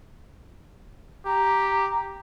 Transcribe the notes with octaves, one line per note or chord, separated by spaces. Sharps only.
G4 A#5